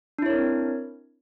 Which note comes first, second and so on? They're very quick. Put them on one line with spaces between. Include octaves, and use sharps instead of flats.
D4 E4 C#5 A#4 C4